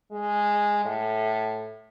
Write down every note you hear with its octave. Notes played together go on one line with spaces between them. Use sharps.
G#3
A2